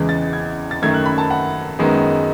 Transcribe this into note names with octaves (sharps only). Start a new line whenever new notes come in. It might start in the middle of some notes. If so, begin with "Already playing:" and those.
Already playing: E2 C#3 E3 G#3
A6
G#6
A6
F#2 D#3 A3 G#6
F#6
B5
A5
F#5
F#2 D#3 G#3 B3